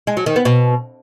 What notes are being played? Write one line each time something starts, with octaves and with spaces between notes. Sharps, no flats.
G#3
F#3
D#3
B3
B2